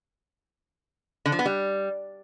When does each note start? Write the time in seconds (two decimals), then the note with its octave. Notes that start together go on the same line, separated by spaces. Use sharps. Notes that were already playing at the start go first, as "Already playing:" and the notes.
1.26 D3
1.32 F3
1.39 B3
1.46 G3